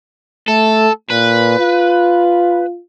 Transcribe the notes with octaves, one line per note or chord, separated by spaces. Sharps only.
A3 A4
A#2 B4
F4